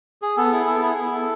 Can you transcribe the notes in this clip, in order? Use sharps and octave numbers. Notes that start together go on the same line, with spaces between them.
G#4
B3 A4
E4 G#4
B3 A4
E4 G#4
E4
B3 A4